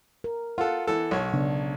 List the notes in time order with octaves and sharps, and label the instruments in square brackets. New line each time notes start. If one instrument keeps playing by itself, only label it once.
[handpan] A#4
[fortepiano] F4 A4 [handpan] F#5
[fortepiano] E3 A4
B1 C#5
[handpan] C#3 B3 D4